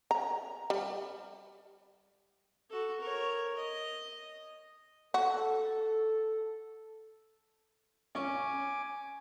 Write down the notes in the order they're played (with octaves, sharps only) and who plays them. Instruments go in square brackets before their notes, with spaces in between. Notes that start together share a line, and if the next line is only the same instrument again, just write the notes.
[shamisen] A#5
G3
[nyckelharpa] F#4 A4
A#4 C#5
D#5
[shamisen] F#4 [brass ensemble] A4
[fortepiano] C#4 C#6 [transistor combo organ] G#5 D6